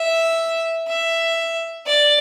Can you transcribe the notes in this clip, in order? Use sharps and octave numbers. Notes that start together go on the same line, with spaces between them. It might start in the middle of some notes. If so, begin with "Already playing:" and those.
Already playing: E5
E5
D5